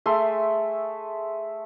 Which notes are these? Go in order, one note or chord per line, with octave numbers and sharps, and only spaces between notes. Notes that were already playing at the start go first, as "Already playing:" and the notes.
A3 G#4 E5 C6